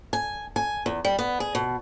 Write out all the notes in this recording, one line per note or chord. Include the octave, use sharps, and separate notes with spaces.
G#5
G#5
E2
G3
B3
G#4
B2